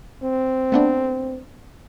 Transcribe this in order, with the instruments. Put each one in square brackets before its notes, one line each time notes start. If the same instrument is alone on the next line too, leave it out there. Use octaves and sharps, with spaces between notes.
[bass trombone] C4
[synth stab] A3 B3 D4